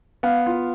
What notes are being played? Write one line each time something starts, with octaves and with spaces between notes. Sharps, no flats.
B3 F5
F4